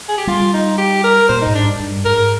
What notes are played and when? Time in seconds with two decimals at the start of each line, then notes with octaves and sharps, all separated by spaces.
0.09 G#4
0.18 G4
0.27 G3 F4
0.54 D#4
0.78 G4
1.04 A#4
1.28 A#2 C5
1.42 G#2 D#4
1.55 D4
1.62 G2
1.80 G2
2.05 G#2 A#4